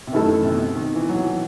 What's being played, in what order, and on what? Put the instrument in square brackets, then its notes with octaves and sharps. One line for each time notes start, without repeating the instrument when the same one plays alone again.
[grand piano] C3
[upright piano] F#2 E3 A3 E4 A4 [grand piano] D#3
[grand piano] C3
B2
C3
D#3
E3
F#3
E3